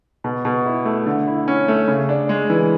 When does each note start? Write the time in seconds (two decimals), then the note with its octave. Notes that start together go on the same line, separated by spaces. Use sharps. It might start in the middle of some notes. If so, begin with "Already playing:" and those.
0.24 B2
0.45 B2
0.66 E4
0.85 A3
1.06 D3
1.27 E4
1.48 C#4
1.68 A3
1.88 C#3
2.09 D4
2.29 G#3
2.50 E3